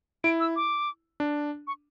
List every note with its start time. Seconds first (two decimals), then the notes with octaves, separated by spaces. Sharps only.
0.24 E4 D7
0.40 E6
0.56 D6
1.20 D4
1.67 C#6